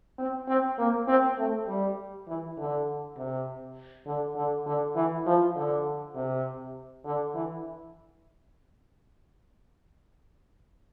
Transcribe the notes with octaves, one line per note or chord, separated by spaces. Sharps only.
C4
C4
A#3
C4
A3
G3
E3
D3
C3
D3
D3
D3
E3
F3
D3
C3
D3
E3